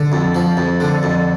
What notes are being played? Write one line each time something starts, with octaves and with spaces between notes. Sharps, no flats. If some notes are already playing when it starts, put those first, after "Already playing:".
Already playing: D3
F2
F3
F2
D3
F2